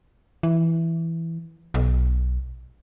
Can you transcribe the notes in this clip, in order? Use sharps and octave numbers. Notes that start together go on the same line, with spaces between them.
E3
B1